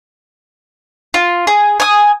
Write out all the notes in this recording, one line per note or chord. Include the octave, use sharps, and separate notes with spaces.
F4
G#4
G#5 D#6